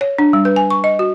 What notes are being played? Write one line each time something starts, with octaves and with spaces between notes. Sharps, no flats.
C#5
D4
G3
B4
G#5
C#6
D#5
F#4